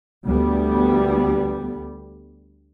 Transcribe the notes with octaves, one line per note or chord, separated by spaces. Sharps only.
D2 G3 B3